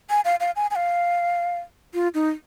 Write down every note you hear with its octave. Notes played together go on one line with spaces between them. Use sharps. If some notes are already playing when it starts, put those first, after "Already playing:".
G#5
F5
F5
G#5
G#5
F5
F4
D#4